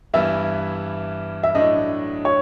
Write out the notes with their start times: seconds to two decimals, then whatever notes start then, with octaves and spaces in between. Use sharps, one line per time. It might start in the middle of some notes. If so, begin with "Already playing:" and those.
0.14 G2 E3 G3 B3 E4 E5
1.43 E5
1.55 A2 F#3 A3 D4 D#5
2.25 C#5